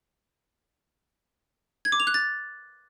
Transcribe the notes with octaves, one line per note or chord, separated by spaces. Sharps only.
G#6
D6
F7
F#6
A6